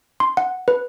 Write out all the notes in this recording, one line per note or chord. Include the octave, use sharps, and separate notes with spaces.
C6
F#5
B4